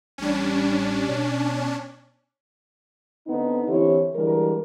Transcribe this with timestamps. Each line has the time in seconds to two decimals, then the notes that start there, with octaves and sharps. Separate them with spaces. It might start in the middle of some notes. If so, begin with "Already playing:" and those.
0.18 A1 G3 C#4 D4
1.06 B2
3.27 D3 B3 C4 D#4
3.68 D3 E3 C4 E4 G4 C#5
4.15 D3 E3 G3 G#3 A#4